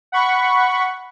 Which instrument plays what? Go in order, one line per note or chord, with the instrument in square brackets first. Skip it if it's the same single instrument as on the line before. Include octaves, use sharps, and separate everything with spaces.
[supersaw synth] F#5 B5 C#6